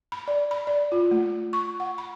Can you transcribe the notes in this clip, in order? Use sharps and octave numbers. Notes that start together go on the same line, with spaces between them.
B5
D5
B5
D5
F4
A3
C#6
F#5
B5